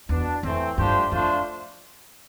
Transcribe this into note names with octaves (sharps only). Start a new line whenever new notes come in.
E2 B2 B3 D4
F2 E3 A3 C4
G2 F3 A3 D4 G4 C5
F2 F3 A3 D4 F4 C5